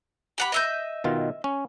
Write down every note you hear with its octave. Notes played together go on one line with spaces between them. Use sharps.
G4 F#5 B5
D#5 E5 G6
B2 D#3 F4
C#4